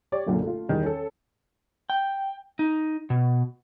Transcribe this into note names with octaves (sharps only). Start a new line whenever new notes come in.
G4 C#5 D5
F#1 B1 A#2 D3 A#3
A3 F4
E2 D#3 G3
C#4 A4
G5
D#4
B2